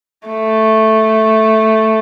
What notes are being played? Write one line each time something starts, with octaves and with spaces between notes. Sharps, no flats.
A3